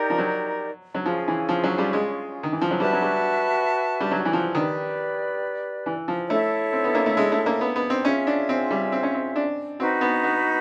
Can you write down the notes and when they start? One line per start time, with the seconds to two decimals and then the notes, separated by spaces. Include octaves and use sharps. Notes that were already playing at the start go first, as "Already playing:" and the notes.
Already playing: D#4 G4 A#4 D5
0.10 F3
0.18 F#3
0.94 F#3
1.05 F3 C#4 F4 G#4
1.28 E3
1.49 F3
1.64 F#3
1.78 G3
1.93 G#3
2.43 D#3
2.52 E3
2.61 F3
2.71 F#3
2.80 G3 F#4 B4 E5 A5
2.93 F#3
3.02 G3
4.00 G3
4.11 F#3
4.25 E3
4.33 F3
4.55 D#3 G4 B4 D5
5.86 E3
6.08 F3
6.29 A3 E4 A4 C#5
6.73 C4
6.84 B3
6.95 A#3
7.06 A3
7.17 G#3
7.32 A3
7.46 A#3
7.61 B3
7.76 B3
7.90 C4
8.04 C#4 F4 G#4 C#5 E5
8.27 D4
8.49 C4
8.71 G3
8.92 C4
9.03 C#4
9.14 C4
9.36 D4
9.80 C4 D#4 F#4 B4
10.01 B3
10.24 B3